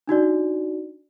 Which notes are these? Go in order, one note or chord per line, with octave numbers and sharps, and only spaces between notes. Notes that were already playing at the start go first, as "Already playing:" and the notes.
D4 D#4 F#4 D5